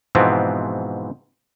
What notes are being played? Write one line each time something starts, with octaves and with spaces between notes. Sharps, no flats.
G#2 B2 E3 F3 B3 C4